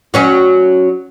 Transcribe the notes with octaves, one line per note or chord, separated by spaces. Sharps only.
F#3 C#4 F#4